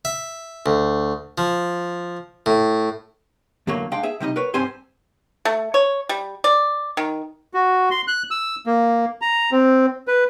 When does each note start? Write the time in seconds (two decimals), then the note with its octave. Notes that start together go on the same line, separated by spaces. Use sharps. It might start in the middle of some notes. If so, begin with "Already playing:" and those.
0.05 E5
0.66 D2
1.38 F3
2.46 A2
3.67 E2 D3 F#3 A3 A#3
3.92 G#3 D4 F5 G5
4.03 G#4 E5
4.20 C3 G3 D#4 D#5
4.36 A#4 B4 C#5
4.54 G2 G3 C4 C5 G#5 C6
5.45 A3
5.74 C#5
6.09 G3
6.44 D5
6.97 D#3
7.54 F#4
7.91 C6
8.07 F#6
8.31 E6
8.66 A#3
9.21 A#5
9.51 C4
10.07 B4